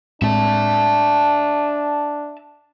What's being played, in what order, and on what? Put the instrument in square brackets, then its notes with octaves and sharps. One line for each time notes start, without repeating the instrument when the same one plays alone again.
[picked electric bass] A2 G#3 C4 [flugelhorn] D4 [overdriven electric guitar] E5 A5